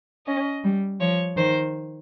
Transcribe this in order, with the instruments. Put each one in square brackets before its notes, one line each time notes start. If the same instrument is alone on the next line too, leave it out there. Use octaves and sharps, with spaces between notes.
[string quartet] C#4 [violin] D#5
[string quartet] G3
[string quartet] F3 [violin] C#5
[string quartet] D#3 [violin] C5